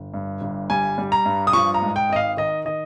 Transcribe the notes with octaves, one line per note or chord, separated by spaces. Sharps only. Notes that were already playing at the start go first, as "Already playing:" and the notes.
Already playing: G1
G2
G1
G3 G#5
G3
A#5
G2
D#6
F3 C#6
A#5
G#2
G5
G#1 D#5
F5
D#3 D#5
D#3 D#5